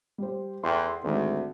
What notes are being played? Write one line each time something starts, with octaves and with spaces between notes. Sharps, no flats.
G3 C5
E2 A4 G5 C6
G#1 D2 D#3 G#3